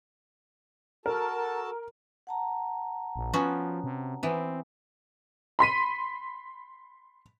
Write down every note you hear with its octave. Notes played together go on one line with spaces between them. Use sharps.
F#4 A4 A#4 A5
F#5 A5 A#5
A#1
F3 B3 C#4 F#4
C3
E3 B3 C4
B5 C6 B6 D#7